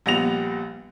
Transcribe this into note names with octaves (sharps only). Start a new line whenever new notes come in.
A#1 G3 B3 A#6 F7